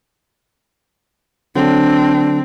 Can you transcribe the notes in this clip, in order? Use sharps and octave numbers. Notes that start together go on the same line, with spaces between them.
D3 F#3 C4 D4